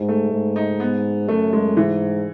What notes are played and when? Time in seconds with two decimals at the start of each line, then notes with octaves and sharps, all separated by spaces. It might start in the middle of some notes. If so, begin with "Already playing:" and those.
Already playing: G#2
0.09 A3
0.31 G#2
0.56 D#4
0.80 B3
1.28 F#2 A3
1.53 G#3
1.77 G#2 E3